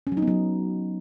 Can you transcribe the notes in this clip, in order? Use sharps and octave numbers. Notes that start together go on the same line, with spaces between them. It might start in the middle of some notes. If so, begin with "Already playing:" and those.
C#4
F#3
D#4
B3
F#3